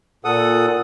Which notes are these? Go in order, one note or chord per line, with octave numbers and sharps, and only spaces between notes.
A#2 A4 F#5 D#6